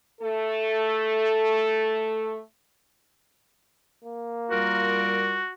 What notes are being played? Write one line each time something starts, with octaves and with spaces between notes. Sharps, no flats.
A3 A4
A#3
G3 F4 F#4 A#4